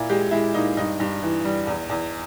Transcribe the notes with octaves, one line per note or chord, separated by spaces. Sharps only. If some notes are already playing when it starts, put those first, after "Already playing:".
Already playing: A#2 E4
G#3 G4
G#3 E4
A#2 D#4
G2 D#4
G2
E3
G3
E2
E2